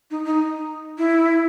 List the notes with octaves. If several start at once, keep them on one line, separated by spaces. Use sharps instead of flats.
D#4
D#4
E4